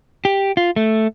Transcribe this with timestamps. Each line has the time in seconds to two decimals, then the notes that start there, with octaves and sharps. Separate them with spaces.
0.25 G4
0.57 F4
0.76 A3